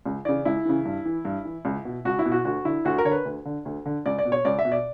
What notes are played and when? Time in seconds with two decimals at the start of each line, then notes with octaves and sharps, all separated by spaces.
0.06 C#2
0.25 C#3 E3 D5
0.45 C#2 E4
0.65 C#3 E3
0.85 G2
1.05 E3
1.25 G2
1.45 E3
1.65 C#2
1.85 B2
2.05 C#2 F#4
2.19 E4
2.25 B2
2.32 F#4
2.45 D2 F#4
2.65 D3 E4
2.85 D2 F#4
2.98 A#4
3.05 D3 C#5
3.12 B4
3.25 D2
3.45 D3
3.65 D2
3.86 D3
4.06 C#2 D5
4.19 D5
4.25 B2
4.32 C#5
4.45 C#2 D5
4.59 E5
4.65 B2
4.72 D5